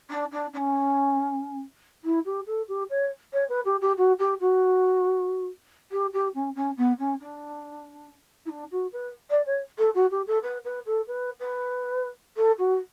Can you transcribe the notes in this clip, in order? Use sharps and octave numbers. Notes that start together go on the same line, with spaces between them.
D4
D4
D4
C#4
E4
G4
A4
G4
C#5
C#5
B4
G4
G4
F#4
G4
F#4
G4
G4
C#4
C#4
B3
C#4
D4
E4
D4
F#4
B4
D5
C#5
A4
F#4
G4
A4
B4
B4
A4
B4
B4
A4
F#4